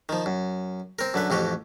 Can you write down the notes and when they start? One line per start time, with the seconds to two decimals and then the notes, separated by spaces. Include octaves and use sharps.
0.09 D#3 F3
0.26 F#2
0.99 C4 A#4
1.14 F#2 D3 B4
1.30 A1 F2 F#4 G4